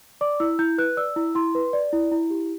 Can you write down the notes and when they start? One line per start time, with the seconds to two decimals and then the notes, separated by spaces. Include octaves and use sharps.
0.21 D5 D6
0.40 E4 E6
0.59 E4 G6
0.78 B4 F#6
0.97 D5 E6
1.16 E4
1.35 E4 C6
1.55 B4
1.73 D5
1.93 E4
2.11 E4
2.30 G4